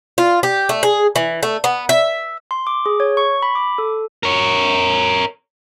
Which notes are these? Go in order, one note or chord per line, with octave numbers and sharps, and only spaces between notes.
F4
G4
A3
G#4
E3
A3
B3
E5
C6
D6
G#4
C#5
C#6
B5
D6
A4
A#4 C#5